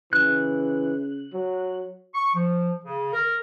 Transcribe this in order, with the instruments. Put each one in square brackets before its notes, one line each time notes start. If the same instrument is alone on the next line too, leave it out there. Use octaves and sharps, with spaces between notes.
[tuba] C#3 [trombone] E3 [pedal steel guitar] F#6
[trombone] F#3
[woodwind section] C#6
F3
C#3
A#4